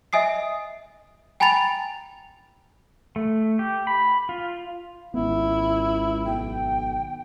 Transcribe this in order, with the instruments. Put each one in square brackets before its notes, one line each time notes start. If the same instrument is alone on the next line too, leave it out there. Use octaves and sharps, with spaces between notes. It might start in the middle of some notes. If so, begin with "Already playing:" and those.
[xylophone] D#5 E5 G#5 D#6 C7
G5 G#5 A#5 B5 A6 F7
[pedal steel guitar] A3
G4
B5
F4
[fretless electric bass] G#1 B3 [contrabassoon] C#2 [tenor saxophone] E4
[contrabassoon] B1 [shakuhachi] G5